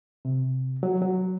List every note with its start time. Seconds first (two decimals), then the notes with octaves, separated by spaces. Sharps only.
0.25 C3
0.83 F#3
1.02 F#3